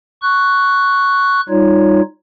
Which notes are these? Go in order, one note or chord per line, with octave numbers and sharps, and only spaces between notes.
C#6 F#6
G3 D#4 F4 C#5